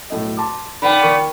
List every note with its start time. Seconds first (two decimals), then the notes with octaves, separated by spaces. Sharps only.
0.10 B1 A2 D#5
0.37 A5 C6 D6
0.82 A#2 D#3 B3 G5 B5
1.01 D#2 A#3 C#6